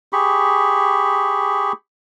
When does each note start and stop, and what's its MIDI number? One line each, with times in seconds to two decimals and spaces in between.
0.13 1.72 67
0.13 1.72 68
0.13 1.72 83
0.13 1.72 85